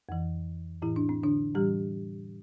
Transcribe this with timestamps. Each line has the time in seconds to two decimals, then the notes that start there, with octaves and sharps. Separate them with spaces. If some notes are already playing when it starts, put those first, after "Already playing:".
0.09 F2 E3
0.82 A2 E3 E4
0.96 D4
1.09 C4
1.23 D3 D4
1.55 A2 E3 G3 G4